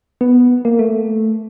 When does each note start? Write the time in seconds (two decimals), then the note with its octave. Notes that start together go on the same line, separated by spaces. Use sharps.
0.21 B3
0.65 A#3
0.79 A3